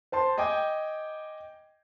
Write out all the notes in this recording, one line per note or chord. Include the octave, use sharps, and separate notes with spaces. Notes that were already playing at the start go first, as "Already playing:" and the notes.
C5 A5 C6
D#5 G5 G#5 D6